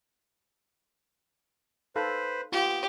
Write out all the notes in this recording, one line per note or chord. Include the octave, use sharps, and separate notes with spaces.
D#4 A4 B4 C5 F5
B3 F4 G4